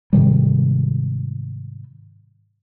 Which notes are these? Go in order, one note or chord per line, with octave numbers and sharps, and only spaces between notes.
G#2 C3 D#3 G3